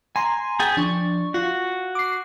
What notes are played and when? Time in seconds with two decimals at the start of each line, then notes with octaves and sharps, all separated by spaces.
0.16 G#5 A#5 C6
0.60 G#4 G5 G#5 A6 B6
0.77 F3 D4 D5 C#6
1.34 F4 F#4
1.95 D6 C7